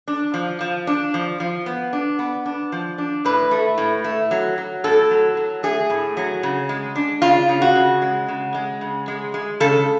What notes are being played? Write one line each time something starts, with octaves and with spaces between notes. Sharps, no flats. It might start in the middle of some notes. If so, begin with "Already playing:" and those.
D4
F3
F3
D4
F3
F3
B3
D4
B3
D4
F3
D4
A2 B4
A3
A2
A3
F#3
F#3
A2 A4
F#3
F#3
A3 G#4
A2
F#3
C#3
G#3
D4
C#3 F4
C#3
F#4
C#3
G#3
C#3
G#3
C#3
G#3
G#3
C#3 A4